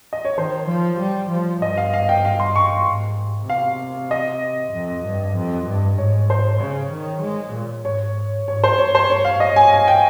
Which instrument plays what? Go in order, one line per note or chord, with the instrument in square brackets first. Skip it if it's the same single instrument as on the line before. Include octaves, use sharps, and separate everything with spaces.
[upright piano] D#5
C#5
[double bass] D#3 [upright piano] C5
[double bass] F3
G3
F3
[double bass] G2 [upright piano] D#5
[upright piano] F5
F5
G5
[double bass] G2 [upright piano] F5
[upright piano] C6
C#6
[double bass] G#2
[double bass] C3 [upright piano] F5
[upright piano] D#5
[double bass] F2
G2
F2
G2
[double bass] G#2 [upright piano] C#5
[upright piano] C5
[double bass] C#3 [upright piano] C#5
[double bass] D#3
G#3
A#2
[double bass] G#2 [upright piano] C#5
[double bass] G#2 [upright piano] C#5
[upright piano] C5
[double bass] G2 [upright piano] C#5
[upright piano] C5
C#5
F5
D#5
G#5
G#5
G5